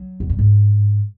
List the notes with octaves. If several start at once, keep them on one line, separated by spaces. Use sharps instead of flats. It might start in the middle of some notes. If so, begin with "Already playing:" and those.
Already playing: F#3
E2
F#2
G#2